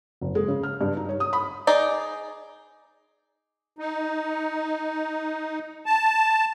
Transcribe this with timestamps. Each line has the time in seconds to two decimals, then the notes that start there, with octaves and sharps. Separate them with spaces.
0.21 F#1
0.35 G#3
0.48 C#3
0.63 F6
0.81 G2
0.97 D#4
1.09 C#5
1.20 D#6
1.33 B5
1.67 D#4 G#4 D5
3.79 D#4
5.86 A5